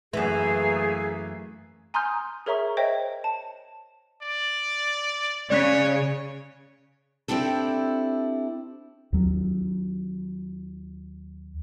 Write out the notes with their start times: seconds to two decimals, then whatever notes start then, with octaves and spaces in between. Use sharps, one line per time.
0.13 F#2 E3 A3 A#3 G#4
1.94 G#5 A#5 C6 D#6 F6 G6
2.46 G#4 A#4 C#5 E5 A#5 C#6
2.77 C5 C#5 D#5 E5 G5
3.24 A5
4.22 D5
5.50 C#3 C#5 D5 F#6 B6
7.28 C4 D4 E4 G4 A4
9.13 D#2 F#3